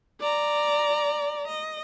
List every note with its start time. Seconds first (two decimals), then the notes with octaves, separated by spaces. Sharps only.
0.20 D5 A#5
1.47 D#5